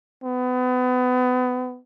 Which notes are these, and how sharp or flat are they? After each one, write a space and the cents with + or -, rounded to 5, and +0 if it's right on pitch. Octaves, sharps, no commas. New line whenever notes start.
B3 +30